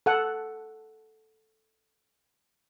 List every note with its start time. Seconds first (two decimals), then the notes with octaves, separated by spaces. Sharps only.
0.06 A4 F#5